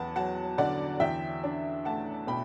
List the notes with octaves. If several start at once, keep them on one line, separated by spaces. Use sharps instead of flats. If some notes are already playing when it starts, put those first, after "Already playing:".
Already playing: E2 B3 F#5 A5 B5
F#3 F#5 A5
D3 D5 F#5
E2 E5 G5
D4
A3 F#5 A5
B2 G5 B5